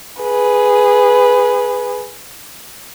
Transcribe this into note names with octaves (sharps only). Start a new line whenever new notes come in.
G#4 B4